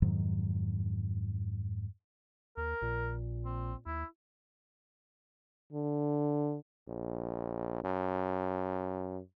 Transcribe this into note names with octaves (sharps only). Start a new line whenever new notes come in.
F2 G#2 D#3 F#3
D#2 A#4
A#1 A#2
C4
D#2 E4
D3
A#1
F#2